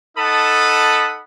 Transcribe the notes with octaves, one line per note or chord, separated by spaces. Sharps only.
D#4 A4 F#5 A5 B5 D#6